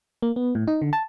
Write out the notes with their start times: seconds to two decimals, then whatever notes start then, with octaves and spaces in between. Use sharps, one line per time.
0.22 A#3
0.36 B3
0.55 A2
0.68 D#4
0.82 D3
0.93 A5